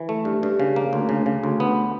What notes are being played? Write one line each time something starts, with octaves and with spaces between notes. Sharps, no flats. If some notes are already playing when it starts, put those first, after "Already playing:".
Already playing: E3
A3
G2
G2
C#3
A#3
D2
C#3
C#3
D2
B3